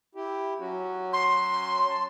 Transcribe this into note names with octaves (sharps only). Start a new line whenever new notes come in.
E4 G4
F#3 C#4 F#4
C6
A5